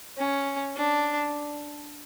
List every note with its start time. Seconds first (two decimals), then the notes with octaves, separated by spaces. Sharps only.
0.18 C#4
0.75 D4